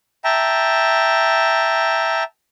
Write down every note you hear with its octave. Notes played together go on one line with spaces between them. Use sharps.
E5 G5 A5 A#5